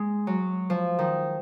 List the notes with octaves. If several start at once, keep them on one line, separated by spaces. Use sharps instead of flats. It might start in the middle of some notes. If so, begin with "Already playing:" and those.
Already playing: G#3
F#3
F3
D#3